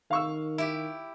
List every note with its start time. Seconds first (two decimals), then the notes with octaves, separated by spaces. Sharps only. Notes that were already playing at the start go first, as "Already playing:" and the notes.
0.11 D#3 F5 C#6 E6
0.58 E4 G4